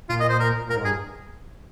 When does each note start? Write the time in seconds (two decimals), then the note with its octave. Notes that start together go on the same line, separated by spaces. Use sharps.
0.09 A#2 F4
0.20 D#5
0.29 C5
0.39 A#4
0.70 A#2 A#4
0.77 G#2
0.84 G2 G#4